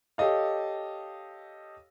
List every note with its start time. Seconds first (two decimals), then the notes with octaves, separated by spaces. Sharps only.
0.18 G4 A4 C#5 D#5 F5